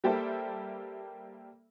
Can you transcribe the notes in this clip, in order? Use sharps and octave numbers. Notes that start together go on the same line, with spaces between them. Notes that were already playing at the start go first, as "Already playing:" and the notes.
G3 A#3 G4 A4 C5 E5